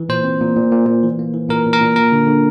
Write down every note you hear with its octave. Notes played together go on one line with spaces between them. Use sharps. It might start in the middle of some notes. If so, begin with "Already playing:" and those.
Already playing: E3
A#2 C5
C4
A#2
A#2
A#2
A#2
E3
A#3
E3
A#2 A#4
A#2
A#4
A#2
A#3 A#4
D3
D3